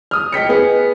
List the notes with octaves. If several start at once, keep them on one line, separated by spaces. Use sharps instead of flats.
D#6 F6
D#5 G5 B6 C#7
B3 G#4